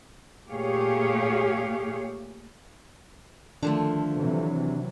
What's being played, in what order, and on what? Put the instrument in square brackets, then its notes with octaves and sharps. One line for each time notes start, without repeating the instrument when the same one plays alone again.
[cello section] A#2 A3 G4 G#4 C#5 F5
[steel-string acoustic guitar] D3 F3 A3 [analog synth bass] D#3 [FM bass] D4
[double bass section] C3 E3 F#3